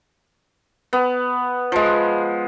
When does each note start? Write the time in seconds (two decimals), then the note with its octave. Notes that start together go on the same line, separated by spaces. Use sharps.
0.93 B3
1.72 F3 G#3